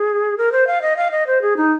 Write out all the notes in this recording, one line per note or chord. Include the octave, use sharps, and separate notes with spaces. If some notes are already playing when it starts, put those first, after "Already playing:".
Already playing: G#4
A#4
C5
F5
D#5
F5
D#5
C5
G#4
D#4